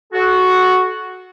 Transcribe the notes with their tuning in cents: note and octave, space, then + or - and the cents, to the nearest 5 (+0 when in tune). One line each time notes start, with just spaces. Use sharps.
F#4 +0 A4 -35